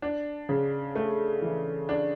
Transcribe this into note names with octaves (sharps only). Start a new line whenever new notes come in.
D4
C#3
A3
E3
D4